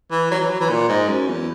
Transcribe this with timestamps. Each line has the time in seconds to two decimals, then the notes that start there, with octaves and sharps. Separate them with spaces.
0.11 E3
0.31 F#3
0.40 E3
0.50 F#3
0.61 E3
0.70 A#2
0.89 G#2
1.08 F#2
1.28 E2